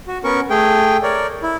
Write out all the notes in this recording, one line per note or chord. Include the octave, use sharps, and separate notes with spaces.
F#4
B3 C#4 A#4 C#6
A3 G#4 G5
A#4 C#5 D5
E4